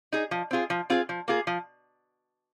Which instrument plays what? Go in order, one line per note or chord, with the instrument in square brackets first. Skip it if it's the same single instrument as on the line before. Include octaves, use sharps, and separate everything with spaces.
[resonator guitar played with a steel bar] D#4 G#4
F3
C4 F4 G#4
F3
C4 F4 G#4
F3
A#3 F4 G#4
F3